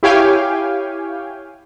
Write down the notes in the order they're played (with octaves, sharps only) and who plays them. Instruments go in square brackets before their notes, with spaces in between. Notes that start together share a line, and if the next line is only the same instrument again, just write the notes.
[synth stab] E4 G4 C#5 F5 G5 G#5